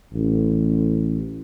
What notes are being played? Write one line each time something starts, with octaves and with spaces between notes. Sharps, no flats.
A1